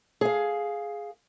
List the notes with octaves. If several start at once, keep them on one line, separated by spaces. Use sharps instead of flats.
G#4 F5